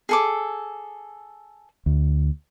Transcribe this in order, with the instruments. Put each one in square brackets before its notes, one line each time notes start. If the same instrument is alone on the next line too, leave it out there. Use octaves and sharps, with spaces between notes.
[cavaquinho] G#4 A4 D6
[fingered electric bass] D2